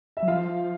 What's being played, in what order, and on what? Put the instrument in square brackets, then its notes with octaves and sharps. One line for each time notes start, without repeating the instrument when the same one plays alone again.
[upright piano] E5
[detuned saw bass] F#3
[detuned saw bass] F3 [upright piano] F4 F5